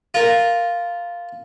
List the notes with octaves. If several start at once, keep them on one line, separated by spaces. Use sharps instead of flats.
F4 A#4